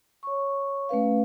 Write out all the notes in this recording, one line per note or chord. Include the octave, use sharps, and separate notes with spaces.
C#5 C#6
A3 C#4 B4 F5